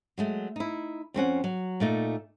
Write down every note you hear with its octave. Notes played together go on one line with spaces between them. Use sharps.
F#3 G#3 A3
D#4 E4
F2 C4 C#4 F#5
F#3
A#2 A3 D#4